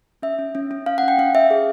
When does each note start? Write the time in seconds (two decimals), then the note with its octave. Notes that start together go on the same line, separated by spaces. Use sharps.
0.22 C#4 E5
0.39 C#4
0.55 C#4
0.71 C#4
0.86 C#4 F5
0.98 F#5
1.03 C#4
1.08 G5
1.18 C#4 F5
1.35 C#4 E5
1.51 G#4